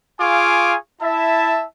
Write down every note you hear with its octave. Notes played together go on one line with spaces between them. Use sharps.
F4 G#4 F5 G#5 C#6 D6
E4 E5 A5